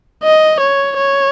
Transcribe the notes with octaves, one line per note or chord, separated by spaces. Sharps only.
D#5
C#5
C#5